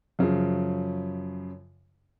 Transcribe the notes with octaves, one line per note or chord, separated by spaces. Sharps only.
F#2 C#3 F3